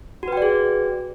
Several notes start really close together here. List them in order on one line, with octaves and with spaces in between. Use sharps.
F#4 B4 G5 D5 G#4